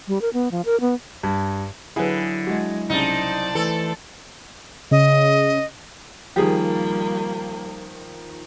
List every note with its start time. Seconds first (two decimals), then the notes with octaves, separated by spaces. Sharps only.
0.08 G3
0.21 A#4
0.33 B3
0.51 F3
0.65 A#4
0.81 B3
1.23 G2
1.96 D3 F#3 E4 G#4 B4
2.47 G#3 F#4
2.89 C2 C#3 D#4 C5 D5 A5
3.55 E3 A3 A4
4.91 C#3 D#5
6.36 D#3 F3 G3 A#3 G4 G#4